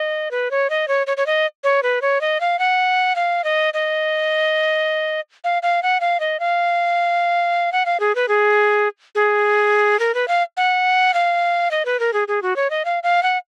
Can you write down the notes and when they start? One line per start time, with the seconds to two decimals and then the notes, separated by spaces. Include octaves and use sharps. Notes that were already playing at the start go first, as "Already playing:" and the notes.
Already playing: D#5
0.31 B4
0.51 C#5
0.70 D#5
0.88 C#5
1.07 C#5
1.17 C#5
1.26 D#5
1.64 C#5
1.83 B4
2.02 C#5
2.21 D#5
2.40 F5
2.59 F#5
3.16 F5
3.44 D#5
3.74 D#5
5.44 F5
5.62 F5
5.83 F#5
6.00 F5
6.20 D#5
6.40 F5
7.72 F#5
7.86 F5
8.00 G#4
8.15 B4
8.28 G#4
9.15 G#4
9.99 A#4
10.14 B4
10.28 F5
10.57 F#5
11.14 F5
11.71 D#5
11.85 B4
12.00 A#4
12.13 G#4
12.28 G#4
12.42 F#4
12.56 C#5
12.70 D#5
12.85 F5
13.03 F5
13.23 F#5